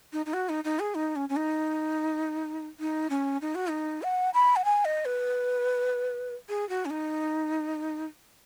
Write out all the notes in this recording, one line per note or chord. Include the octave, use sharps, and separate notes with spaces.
D#4
D#4
F#4
D#4
D#4
G#4
D#4
C#4
C#4
D#4
D#4
C#4
D#4
F#4
D#4
F#5
B5
F#5
G#5
D#5
B4
G#4
F#4
C#4
D#4